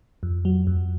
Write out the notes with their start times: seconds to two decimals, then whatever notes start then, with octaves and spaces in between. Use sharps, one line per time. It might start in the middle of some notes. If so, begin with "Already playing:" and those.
0.23 F2
0.45 F#3
0.67 F2